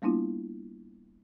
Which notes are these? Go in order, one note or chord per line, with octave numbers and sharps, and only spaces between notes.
G3 A#3 B3 D4 E4 F4